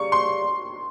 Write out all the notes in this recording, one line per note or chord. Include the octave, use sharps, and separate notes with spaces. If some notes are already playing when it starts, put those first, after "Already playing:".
Already playing: C#3 G3 A#3 C#6
C6